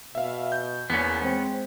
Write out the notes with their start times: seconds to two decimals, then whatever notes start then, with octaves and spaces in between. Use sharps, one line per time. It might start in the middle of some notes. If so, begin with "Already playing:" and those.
0.15 B2 E5 F5
0.52 G6
0.90 E2 A#3 B3 C#4
1.22 G#3 C4